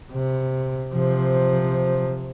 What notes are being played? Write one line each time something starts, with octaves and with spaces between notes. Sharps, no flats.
C3
C3 F3